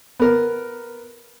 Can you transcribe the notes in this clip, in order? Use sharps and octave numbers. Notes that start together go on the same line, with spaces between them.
B3 A#4